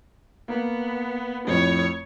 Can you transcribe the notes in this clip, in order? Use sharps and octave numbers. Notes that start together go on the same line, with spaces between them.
A#3 B3
F2 A2 C#5